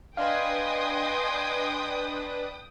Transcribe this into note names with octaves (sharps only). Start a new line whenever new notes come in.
D4 B4 D#5 F5 G5 G#5 C6 D#6